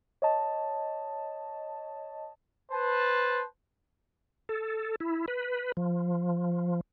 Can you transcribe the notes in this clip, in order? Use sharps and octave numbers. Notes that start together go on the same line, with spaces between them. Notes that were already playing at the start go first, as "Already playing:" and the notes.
C#5 D#5 A5
B4 C5 A5
A4
E4
B4
F3